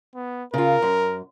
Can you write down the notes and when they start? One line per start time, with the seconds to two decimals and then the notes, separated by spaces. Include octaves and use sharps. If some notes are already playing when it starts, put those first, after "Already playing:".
0.15 B3
0.54 C#3 F4 A#4
0.82 F#2